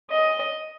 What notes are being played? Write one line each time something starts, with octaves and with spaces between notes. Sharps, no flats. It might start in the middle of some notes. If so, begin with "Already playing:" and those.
D#5